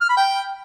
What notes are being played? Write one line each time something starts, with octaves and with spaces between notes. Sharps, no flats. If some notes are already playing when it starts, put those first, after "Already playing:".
F6
B5
G5